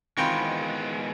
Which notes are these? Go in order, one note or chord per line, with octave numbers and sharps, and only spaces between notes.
D#3 E3 G#3 B3 C4 F4 G5 C#6